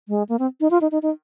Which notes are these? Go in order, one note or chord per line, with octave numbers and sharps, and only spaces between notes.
G#3
A#3
C4
D#4
F4
D#4
D#4
D#4